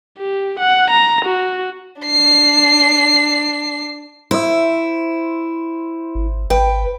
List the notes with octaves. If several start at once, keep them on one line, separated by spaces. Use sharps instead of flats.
G4
F#5
A#5
F#4
D4 C7
E4 C5 E5
G#1
G#1 B4 G5